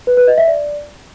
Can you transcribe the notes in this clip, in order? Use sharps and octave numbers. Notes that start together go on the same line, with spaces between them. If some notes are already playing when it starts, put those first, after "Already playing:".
B4
B4
D#5
E5
D5